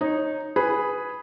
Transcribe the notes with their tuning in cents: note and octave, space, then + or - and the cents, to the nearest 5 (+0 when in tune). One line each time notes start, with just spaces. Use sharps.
D#4 -5 C#5 -25
G#4 +0 B4 +0 B5 +0